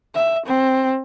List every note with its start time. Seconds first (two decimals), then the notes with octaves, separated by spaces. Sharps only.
0.15 E5
0.47 C4